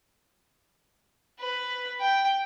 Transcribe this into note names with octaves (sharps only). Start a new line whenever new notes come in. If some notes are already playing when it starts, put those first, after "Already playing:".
B4
G5